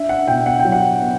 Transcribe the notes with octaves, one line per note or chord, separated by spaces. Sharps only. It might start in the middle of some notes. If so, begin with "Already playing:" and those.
Already playing: D4 E5
F#5
B2 G5
F#5
G5
F#3
F#5
B3